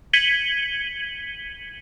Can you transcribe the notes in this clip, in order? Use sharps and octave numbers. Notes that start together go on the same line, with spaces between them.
G#6 B6 C#7 D#7 F#7 G7